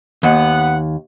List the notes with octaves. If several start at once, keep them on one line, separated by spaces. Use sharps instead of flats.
D#2 B3 F#5